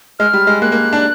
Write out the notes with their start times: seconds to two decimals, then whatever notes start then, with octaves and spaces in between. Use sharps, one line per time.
0.19 G#3 F6
0.34 G3
0.47 G#3
0.61 A#3 F#6
0.72 A#3
0.93 D4